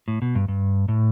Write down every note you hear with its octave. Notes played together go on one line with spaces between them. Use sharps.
A2
B2
G2
G2
A2